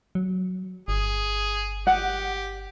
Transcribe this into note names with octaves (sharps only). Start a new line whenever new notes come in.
F#3
G1 G#4
G4 F#5